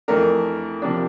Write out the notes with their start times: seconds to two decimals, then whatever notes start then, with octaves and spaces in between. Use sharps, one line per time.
0.08 F2 E3 A3 D4 A#4
0.82 C3 F3 A#3 D4